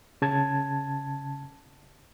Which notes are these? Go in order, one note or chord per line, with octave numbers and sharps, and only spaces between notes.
C#3 A5 G#6